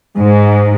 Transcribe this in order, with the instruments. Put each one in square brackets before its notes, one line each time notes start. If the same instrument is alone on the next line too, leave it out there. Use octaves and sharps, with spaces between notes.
[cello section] G#2